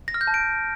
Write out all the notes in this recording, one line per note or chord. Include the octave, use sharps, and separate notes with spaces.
A#6
F6
G6
A5
D7